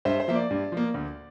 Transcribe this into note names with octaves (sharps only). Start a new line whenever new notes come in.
G2 C5 E5
C5
F3 A#3 E5
D5
G2
F3 A#3
D2